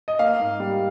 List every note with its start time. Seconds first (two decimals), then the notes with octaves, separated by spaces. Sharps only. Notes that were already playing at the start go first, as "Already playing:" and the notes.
0.08 D#5
0.19 A#3 F5
0.39 G#2
0.60 G3